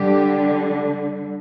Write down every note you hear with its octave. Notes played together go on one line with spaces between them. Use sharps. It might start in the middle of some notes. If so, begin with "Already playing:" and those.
Already playing: D3 G3 G4